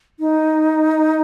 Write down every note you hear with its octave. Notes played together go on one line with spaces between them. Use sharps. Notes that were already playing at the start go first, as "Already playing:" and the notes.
D#4